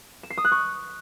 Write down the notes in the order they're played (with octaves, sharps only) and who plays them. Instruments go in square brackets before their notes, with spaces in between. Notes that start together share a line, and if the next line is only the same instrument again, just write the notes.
[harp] E7
C7
D#6
F#6
C#6